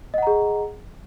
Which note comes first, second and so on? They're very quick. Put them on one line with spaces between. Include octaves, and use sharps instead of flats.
D#5 F#5 A#5 G#4